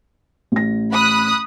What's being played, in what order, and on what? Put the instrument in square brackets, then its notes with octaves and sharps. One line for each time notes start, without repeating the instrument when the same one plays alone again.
[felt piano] A1 A#6
[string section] B5 D#6 F#6